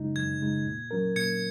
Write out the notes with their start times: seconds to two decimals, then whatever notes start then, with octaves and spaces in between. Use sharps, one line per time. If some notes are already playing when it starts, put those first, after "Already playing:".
Already playing: F#2 C#3 G#3 D#4
0.16 F#2 G#6
0.41 C#3 G#3 D#4
0.66 A#2
0.91 F#3 C#4 A#4
1.16 A#2 G#6 C#7